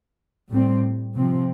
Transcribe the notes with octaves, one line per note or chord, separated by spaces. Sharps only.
A2 G3 C4
C3 F3 C4